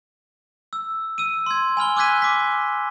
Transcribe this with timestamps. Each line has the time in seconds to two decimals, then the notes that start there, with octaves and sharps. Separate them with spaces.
0.73 E6
1.18 E6 D#7
1.46 C6 G#6
1.77 G#5 B5 F6 G7
1.97 D6 E6 F#6 G#6 B6 D#7
2.22 D6 B6